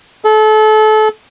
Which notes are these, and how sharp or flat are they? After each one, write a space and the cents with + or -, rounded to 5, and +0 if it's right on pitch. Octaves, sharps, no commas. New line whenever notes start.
A4 -30